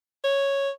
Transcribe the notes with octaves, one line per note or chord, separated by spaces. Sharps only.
C#5